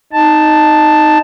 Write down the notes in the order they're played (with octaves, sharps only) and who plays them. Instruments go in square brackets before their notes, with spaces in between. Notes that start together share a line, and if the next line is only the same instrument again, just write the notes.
[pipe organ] D#4 A5